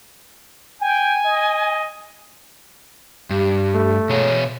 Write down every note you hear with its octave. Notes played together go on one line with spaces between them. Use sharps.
G5 G#5
D#5
G2 G4
A3
B2 G#4 C#5